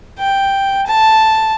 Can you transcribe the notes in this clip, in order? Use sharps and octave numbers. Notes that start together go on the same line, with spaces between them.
G5
A5